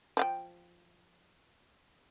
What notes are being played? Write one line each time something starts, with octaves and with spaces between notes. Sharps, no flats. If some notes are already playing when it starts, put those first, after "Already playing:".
F3 F5 G5